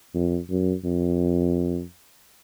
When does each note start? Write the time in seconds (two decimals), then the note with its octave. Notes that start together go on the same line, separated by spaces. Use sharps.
0.15 F2
0.50 F#2
0.85 F2